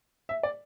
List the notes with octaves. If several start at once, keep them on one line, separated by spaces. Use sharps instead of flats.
E5
D5